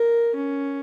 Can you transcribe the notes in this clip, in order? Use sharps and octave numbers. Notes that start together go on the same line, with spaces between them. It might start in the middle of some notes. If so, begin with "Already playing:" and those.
Already playing: A#4
C#4